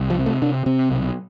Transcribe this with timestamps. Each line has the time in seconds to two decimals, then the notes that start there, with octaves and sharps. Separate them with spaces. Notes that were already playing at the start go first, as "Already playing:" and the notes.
Already playing: C2
0.10 F3
0.19 C3
0.26 A3
0.42 C3 D4
0.66 C3 C4
0.90 B1